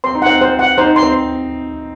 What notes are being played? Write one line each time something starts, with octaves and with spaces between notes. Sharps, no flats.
C4 C6
D#4
C4 F#5
C5
F#5
D#4 C5
C6
C4